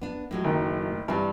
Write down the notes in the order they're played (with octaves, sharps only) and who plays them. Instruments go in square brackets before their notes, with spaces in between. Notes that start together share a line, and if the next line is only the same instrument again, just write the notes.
[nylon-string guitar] B3 D4
A2 F#3 G#3
[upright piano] F#1 D#3
[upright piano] G2 [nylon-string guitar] E3 G3 C4